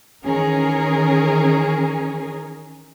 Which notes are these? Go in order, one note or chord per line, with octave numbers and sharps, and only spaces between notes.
D#3 E3 C#4 G#4 A#4